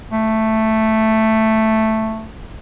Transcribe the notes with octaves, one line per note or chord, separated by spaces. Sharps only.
A3